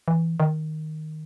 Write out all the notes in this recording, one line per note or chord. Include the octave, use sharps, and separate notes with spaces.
E3
D#3